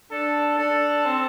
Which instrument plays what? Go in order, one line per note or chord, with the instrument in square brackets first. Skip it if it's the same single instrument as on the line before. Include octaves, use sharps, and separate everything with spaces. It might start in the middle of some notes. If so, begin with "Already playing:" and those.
[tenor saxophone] D4 [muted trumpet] A4
[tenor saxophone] D4 [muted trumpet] A4
[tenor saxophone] C4